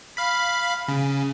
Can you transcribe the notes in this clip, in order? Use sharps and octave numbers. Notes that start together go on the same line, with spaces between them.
F5 B5
C#3